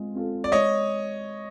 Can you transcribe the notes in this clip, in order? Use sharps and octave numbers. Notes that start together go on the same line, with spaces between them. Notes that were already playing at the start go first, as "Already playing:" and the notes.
Already playing: G#3 C4 F4
C4 F4 A4
D5
G#3 C#5 D#5